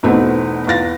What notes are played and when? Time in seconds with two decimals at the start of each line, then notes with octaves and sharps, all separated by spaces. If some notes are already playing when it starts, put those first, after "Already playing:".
0.03 E2 B2 A3 C4 D#4
0.67 E2 F4 A6 A#6